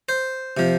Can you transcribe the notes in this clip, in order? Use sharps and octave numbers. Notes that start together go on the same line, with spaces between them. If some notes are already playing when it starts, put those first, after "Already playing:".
C5
C3 F3